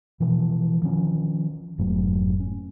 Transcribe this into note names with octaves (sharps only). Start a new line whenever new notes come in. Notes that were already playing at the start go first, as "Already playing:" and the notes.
B2 E3 F3
D#3 F3 C#4
F1 G#2 F#3 A3
C#4